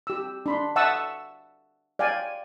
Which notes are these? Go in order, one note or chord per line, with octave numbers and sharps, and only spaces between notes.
G4 E6
D4 B5 C6
E5 F#5 A5 C#6 D#6 E6
D5 F5 G5 G#5